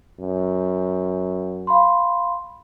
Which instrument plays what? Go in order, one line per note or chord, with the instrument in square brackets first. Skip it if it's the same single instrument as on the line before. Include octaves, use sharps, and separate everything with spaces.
[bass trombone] F#2
[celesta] F5 B5 C6